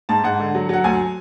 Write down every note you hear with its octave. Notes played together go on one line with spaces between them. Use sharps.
G#2 A5
G#2 F#5
D3
F#3
F#3 F#5
D2 G#5